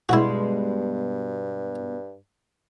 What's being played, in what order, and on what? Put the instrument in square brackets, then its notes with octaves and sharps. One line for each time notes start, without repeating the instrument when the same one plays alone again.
[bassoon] G2 [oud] B2 G3 G#3 [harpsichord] E4 F#4